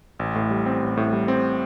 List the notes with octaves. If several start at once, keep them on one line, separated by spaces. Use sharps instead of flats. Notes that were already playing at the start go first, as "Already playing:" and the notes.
A1
A2
G3
C4
A1
A2
G3
C4